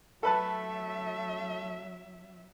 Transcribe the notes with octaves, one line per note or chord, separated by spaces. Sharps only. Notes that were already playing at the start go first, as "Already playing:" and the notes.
F#3 A3 A4 B4 E5 A5